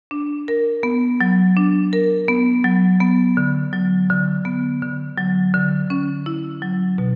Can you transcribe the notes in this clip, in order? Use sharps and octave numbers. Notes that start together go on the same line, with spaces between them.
D4
A#4
B3
F#3
D4
A#4
B3
F#3
B3
D3
F#3
D3
B3
D3
F#3
D3
C#4
E4
F#3
B2